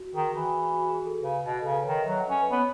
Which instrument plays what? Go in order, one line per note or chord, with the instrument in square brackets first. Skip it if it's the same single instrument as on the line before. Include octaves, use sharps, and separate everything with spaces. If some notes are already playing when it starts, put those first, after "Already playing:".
Already playing: [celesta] F#4
[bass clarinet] D#3 [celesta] G#4
[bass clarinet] E3 [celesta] F#4
[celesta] G#4
F#4
G#4
A4
[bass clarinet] C#3 [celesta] B4
[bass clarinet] B2
[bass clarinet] C#3 [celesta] A4
[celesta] B4
[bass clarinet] D#3 [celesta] C#5
[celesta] D#5
E5
[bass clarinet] F#3
[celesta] F#5
[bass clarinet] C#4
[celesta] B4
[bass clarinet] B3 [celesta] C#5